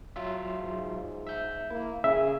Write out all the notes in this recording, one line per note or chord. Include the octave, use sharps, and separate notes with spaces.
F#3 F4 E5
G#2
E5 G6
A#3 E4
C#3 G#4 E5